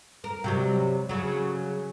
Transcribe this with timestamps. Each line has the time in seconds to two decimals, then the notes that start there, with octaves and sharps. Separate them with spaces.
0.24 A#4
0.44 C3 F#3 G3
1.09 C#3 F#3